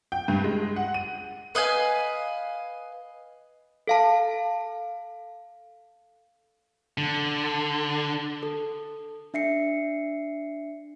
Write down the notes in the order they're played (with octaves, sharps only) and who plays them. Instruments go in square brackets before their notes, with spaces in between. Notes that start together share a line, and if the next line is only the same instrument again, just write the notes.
[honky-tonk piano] G5
G2
G#3
F#5
D#7
[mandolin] B4 D#5 F5 G#5
[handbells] A4 F5 A5
[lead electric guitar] D3
[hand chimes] A4
D4 E5 C7 C#7